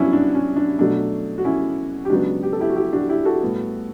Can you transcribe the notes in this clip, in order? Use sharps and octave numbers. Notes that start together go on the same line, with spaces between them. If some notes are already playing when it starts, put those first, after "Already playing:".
Already playing: G2 F#3 B3 C#4 D4 E4 F#4
D4
C#4
D4
B2 F#3 A3 D4
F#4
C#4 E4
G4
C#2 C#3 F#3 B3 D4 F#4
G4
A4
E4 G4
F#4
E4 G4
D4 F#4
E4 G4
F#4 A4
A2 G3 B3